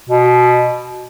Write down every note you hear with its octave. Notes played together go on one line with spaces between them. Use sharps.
B2